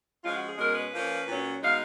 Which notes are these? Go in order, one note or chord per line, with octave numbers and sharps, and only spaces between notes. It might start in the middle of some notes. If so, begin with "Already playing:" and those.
F3 G#3 C#4 F4
F#4
G#4
B2 G#3 C#4 A#4
B4
F3 A#3 C#4
A#2 F#3 C#4
B2 G#3 D#4 F5